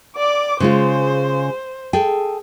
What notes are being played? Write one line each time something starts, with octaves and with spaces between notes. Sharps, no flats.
D5 D6
C#3 G#3 F4 C5
G#4 A4 G5